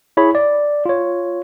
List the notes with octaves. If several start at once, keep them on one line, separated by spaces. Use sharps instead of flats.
E4 G#4 C#5 B5
D5
F4 C#5